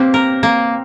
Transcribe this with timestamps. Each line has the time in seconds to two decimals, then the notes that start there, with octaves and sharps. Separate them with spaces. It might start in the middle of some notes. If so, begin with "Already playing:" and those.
Already playing: A#3 C4 G4
0.14 A#4
0.43 A#3